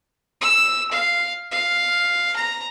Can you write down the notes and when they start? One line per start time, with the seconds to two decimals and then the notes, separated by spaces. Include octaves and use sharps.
0.41 E6
0.92 F5
1.51 F5
2.37 A#5